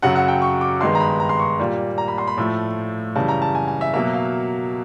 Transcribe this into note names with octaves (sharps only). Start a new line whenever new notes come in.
F#2 C#3 F#3 F#5
F#5
G5
C#6
D6
G2 D#3 G#3 B3 C6
A#5
B5
A#5
C6
C#6
A#2 G3 A#3
A#5
B5
C6
B5
A2 F3 A3
F#2 C#3 E3 G3 A5
A#5
A5
G#5
G#5
E5
B2 F#3 A#3 E5
F5